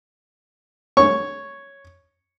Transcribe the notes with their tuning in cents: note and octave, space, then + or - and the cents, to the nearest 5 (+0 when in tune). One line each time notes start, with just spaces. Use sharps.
C#5 +0 C#6 +0